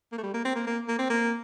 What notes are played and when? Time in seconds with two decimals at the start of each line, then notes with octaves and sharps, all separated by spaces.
0.12 A#3
0.18 A3
0.23 G3
0.34 A#3
0.45 C4
0.56 A#3
0.67 A#3
0.88 A#3
0.99 C4
1.10 A#3